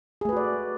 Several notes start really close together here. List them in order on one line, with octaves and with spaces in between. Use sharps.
G#4 A3 B4 F#4 D5